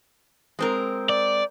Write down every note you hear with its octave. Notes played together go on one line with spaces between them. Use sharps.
G#3 C4 A#4
D5